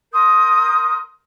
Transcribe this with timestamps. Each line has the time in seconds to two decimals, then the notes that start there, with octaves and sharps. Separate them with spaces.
0.13 A#4 C6 D#6 G6